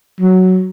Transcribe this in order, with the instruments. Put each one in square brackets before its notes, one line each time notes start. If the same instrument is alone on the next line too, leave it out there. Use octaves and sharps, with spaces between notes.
[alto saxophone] F#3